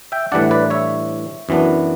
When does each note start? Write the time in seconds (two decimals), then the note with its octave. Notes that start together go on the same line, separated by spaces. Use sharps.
0.12 E5 G5
0.32 A2 E3 G3 D4 D5 F#5
0.51 B4 D5
0.70 C#5 E5
1.49 F#2 E3 B3 D4